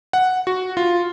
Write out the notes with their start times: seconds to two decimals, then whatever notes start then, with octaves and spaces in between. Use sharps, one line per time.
0.13 F#5
0.47 F#4
0.77 F4